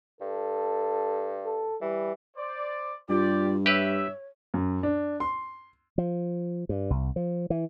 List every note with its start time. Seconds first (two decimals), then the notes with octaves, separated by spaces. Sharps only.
0.21 G2 A4
1.45 A4
1.81 E3 G3
2.36 C5 D5
3.09 G2 F4 G4 D5
3.66 G4 B4 C#5 E5
4.54 F#2
4.83 D4
5.20 C6
5.98 F3
6.69 G2
6.90 C2
7.16 F3
7.50 E3